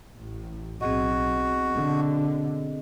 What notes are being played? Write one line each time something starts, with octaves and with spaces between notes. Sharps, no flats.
A1 A2
B1 C4 F#4 G#4 D#5
B2 D3